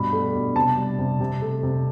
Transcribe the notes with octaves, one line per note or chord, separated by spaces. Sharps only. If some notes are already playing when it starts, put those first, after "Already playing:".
Already playing: G2 B2 B5
A3
B2
C3 A5
G3
C3
C3
A3
C3